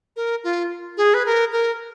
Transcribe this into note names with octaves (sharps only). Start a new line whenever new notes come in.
A#4
F4
G#4
B4
A#4
A#4